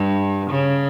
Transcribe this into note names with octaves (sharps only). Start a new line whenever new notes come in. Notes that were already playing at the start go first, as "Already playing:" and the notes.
Already playing: G2
C#3